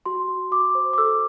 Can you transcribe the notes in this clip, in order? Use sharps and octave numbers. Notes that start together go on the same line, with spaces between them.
F#4 C6
F#4
F#4 D6
C5
D6
A4 E6